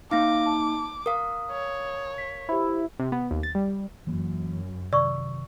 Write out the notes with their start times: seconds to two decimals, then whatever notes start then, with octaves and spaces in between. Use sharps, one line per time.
0.11 A#3 D#4 F5 D6 A#6
0.46 A5
1.06 A#4 F5 D#6
1.51 C#5
2.18 B6
2.49 E4 G4 C5
3.00 C3
3.12 B3
3.31 D#2
3.43 A6
3.55 G3
4.07 F#2 E3 A#3
4.93 C3 D#3 D5 C#6 E6